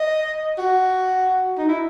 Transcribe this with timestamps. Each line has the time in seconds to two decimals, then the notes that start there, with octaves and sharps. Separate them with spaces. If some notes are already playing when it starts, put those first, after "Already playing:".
Already playing: D#5
0.58 F#4
1.58 D#4
1.69 E4